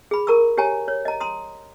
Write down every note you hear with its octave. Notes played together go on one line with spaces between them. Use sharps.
G#4 B5
A#4 A#5 C#6 E6
G4 C#5 G#5 A#5
C#5
D#5 A#5
A#5 C6 D#6